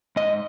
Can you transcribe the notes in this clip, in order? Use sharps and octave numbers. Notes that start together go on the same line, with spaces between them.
G#2 D#5